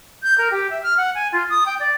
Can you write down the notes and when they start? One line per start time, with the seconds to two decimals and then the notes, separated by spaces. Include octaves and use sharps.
0.23 G6
0.38 A#4
0.51 G4
0.70 E5
0.83 F6
0.97 F#5
1.15 G#5
1.32 F4
1.50 D#6
1.66 G5
1.80 D5